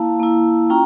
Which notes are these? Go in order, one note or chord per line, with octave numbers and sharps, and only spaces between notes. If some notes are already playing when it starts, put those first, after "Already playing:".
Already playing: A#3 E4 F5 A5
A#3 E4
C#4 F4 G5 A#5